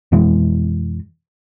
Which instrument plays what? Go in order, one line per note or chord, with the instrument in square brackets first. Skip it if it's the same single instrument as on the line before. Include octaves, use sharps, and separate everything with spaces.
[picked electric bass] F2 B2 E3 G#3